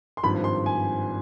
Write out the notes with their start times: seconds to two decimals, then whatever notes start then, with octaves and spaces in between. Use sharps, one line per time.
0.17 C6
0.23 G#1 G2 F3 B5
0.44 C6
0.66 G#5